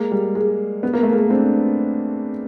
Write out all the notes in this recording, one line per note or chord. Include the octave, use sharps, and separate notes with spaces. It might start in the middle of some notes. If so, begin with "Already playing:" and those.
Already playing: G#3 A#3
G3
G#3
B3
A#3
A3
G#3 A#3
C4 D4